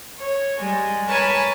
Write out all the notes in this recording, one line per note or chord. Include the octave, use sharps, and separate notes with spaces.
C#5
G3 G#3
A#4 B4 C#5 G#5 A5 B5